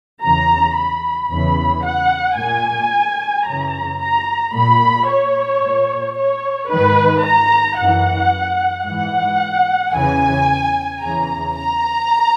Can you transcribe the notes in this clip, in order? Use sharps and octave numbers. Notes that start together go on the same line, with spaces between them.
E2 C#3 E3 A#5
B5
E2 C#3 E3 B5
F#5
A#2 G#5
F#2 C#3 E3 A#5
A#5
A#2 B5
C#5
A#2
C#5
G#2 D#3 B4
A#5
F#2 E3 F#5
G#2 E3 F#5
E2 C#3 E3 G#5
E2 C#3 E3 A#5
A#5